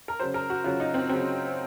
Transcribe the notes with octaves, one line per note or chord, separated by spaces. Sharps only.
A#4
C#3 F#3 C5
A#4
F#4
C#3 F#3 F4
D#4
C4
C#3 F#3 C4